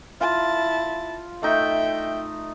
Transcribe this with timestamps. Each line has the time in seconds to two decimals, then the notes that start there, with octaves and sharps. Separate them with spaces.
0.21 E4 F4 A5
1.43 A3 D#4 E5 G5